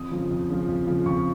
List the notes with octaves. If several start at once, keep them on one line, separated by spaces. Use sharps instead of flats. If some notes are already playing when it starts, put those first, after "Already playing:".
Already playing: F2 D#6
C#3 F3
F2
C#3 F3
F2
C#3 F3
F2 C#6